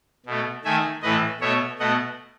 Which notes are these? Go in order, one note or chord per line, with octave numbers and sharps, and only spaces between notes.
B2 A3
D#3 A3 E5 G#5
A2 E3 A3 B4 D#5
B2 A3 C#5 E5
B2 A3 D#5 F#5